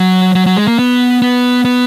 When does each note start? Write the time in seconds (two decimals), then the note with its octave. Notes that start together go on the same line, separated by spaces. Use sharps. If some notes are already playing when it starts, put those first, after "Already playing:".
Already playing: F#3
0.35 F#3
0.47 F#3
0.56 G#3
0.68 A#3
0.79 B3
1.22 B3
1.65 B3